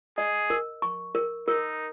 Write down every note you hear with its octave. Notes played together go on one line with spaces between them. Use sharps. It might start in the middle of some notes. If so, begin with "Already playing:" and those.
G#4 D#5
A#4
C#6
A#4
D#4 A#4